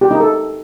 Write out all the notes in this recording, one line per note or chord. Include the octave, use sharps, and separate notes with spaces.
G4
D#4
A4